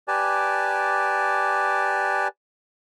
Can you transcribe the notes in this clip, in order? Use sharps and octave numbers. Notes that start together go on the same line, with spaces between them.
G4 B4 D5 G#5 A5